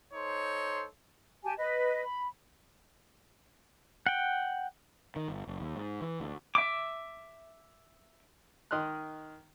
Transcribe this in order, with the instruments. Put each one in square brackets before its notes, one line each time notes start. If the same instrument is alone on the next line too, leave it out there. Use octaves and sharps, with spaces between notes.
[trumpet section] D#4 A4 C5 C#5 C6
[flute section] G4 G#5 A5
B4 D#5
B5
[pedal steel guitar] F#5 G5
[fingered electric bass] D#3
G1
F#1
D#2
G#2
E3
D2
[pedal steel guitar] E5 D6
[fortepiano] D#3 D#5 C6 F6 F#6